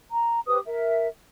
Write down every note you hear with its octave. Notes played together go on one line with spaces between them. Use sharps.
A#5
G4 B4 C5 D#6
A#4 E5